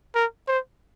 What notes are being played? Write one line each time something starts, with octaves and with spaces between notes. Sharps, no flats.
A#4
C5